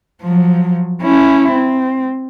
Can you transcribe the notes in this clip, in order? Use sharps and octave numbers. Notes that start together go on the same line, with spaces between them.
F3 F#3
C#4 E4
C4